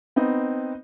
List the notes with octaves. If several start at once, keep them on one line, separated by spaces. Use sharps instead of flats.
B3 C4 D#4